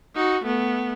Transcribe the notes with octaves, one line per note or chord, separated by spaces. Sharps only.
D#4 F#4
A3 B3